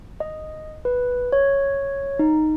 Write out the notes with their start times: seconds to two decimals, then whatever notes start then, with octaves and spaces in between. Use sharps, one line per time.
0.20 D#5
0.85 B4
1.32 C#5
2.19 D#4